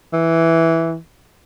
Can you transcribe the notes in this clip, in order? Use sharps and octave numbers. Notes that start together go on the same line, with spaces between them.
E3